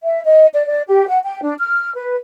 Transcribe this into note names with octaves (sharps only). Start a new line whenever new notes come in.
E5
D#5
D5
D5
G4
F#5
G5
D4
F6
B4